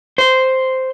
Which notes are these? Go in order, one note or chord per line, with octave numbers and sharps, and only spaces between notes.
C5